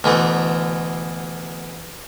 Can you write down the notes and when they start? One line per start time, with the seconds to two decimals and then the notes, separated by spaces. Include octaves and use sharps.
0.04 D2 B2 E3 A3